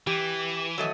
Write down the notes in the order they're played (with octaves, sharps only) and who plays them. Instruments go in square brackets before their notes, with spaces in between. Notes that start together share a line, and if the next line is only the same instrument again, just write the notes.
[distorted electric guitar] E3 [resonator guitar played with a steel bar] G4
[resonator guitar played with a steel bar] F#3 A3 D#5